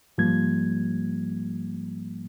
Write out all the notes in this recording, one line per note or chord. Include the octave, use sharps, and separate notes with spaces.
G#2 F3 G3 A#3 G#6